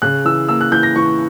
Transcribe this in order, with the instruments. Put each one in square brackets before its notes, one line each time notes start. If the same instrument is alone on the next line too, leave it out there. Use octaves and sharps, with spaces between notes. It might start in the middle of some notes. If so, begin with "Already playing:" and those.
[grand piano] C#3 F#6
E3 E6
A#3 E6
F#6
E3 G6
A#6
E3 C#6